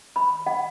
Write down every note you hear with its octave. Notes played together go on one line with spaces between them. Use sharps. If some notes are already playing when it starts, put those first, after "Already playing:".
B5
F#5